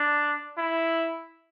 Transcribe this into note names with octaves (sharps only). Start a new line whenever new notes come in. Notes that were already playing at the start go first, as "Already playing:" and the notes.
Already playing: D4
E4